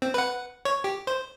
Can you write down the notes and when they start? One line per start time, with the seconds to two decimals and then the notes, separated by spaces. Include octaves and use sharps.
0.02 C4
0.14 B4 F#5
0.65 C#5
0.84 G4
1.07 C5